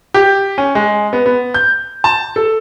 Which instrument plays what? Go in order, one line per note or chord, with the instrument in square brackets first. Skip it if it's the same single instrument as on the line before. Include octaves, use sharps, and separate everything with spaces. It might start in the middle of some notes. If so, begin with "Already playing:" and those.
[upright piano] G4
C#4
G#3
B3
B3
G6
A5
A4